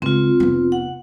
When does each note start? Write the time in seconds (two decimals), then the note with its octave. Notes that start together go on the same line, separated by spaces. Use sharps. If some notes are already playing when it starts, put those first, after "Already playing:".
0.02 C#2 C4 F4
0.40 F1 B3
0.72 F#5